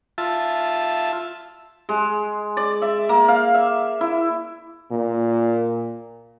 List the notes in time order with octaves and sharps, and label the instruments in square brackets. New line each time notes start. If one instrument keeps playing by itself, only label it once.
[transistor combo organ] F4 E5 A5
[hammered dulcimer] G#3
D5
E5
A#3
F5
E5
E4
[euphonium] A#2